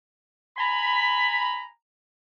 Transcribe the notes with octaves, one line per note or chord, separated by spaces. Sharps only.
G#5 A#5 B5